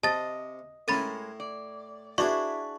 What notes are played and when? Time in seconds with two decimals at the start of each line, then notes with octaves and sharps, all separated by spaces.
0.03 C3 D#5 A5 A6
0.88 A2 G#3 C#4 E4 A#4 B5 A6 D#7
1.40 D5
2.18 D4 E4 F#4 G#4 B4 D5 C#6